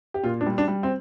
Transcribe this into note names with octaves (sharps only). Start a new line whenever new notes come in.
G4
A#2 F4
D4
G3
D4
G3
C4